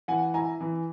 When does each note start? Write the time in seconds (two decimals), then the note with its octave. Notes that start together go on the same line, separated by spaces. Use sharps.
0.08 E3 F#5 G#5
0.34 E4 G#5 A#5
0.61 E3